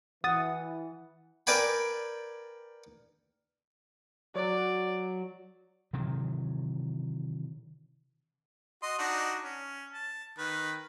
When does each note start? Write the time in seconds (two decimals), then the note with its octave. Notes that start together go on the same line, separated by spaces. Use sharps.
0.24 E3 F#5 D#6 A6
1.47 A#4 B4 D5 G5 G#5 B5
4.35 F#3 D5
5.93 C3 D#3 E3 F#3
8.83 F#4 D#5 C6
8.99 D4 D#4 F#4
9.44 C#4
9.93 A5
10.38 D#3 B4